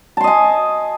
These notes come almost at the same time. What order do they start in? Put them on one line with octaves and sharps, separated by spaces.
A5 C6 D#5 G#5